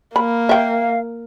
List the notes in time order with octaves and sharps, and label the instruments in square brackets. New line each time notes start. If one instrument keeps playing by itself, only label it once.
[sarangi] A#3 [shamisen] B5
[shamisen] E5 G5 [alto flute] F5